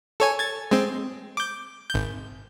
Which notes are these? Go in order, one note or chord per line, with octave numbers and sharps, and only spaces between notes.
A4 C#5 G#5
G#6 A6
G#3 C4
D6 G6
G#1 G6